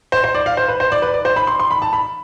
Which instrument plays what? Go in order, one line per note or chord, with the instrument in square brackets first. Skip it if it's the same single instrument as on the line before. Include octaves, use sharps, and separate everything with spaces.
[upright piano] C5
C5
D5
F5
C5
B4
C5
D5
B4
D5
C5
B5
C6
C6
B5
A5
B5